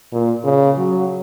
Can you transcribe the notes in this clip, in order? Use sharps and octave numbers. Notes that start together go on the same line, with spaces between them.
A#2
C#3
F#3